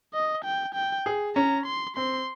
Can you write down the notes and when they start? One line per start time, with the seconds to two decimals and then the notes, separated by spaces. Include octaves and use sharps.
0.14 D#5
0.44 G5
0.75 G5
1.06 G#4
1.35 C#4 A#5
1.66 C6
1.96 C4 C6